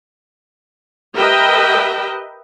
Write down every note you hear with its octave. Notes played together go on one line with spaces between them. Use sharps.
G4 A#4 B4 D#5 E5 G5